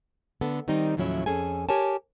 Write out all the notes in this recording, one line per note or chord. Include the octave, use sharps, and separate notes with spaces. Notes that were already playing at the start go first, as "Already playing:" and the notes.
D3 B3 A4
D#3 G3 C4 D#4
D#2 A2 F3 F#3 C#4 E4
F2 C#4 G#4 A4 G#5
G4 A#4 C#5 G#5 A5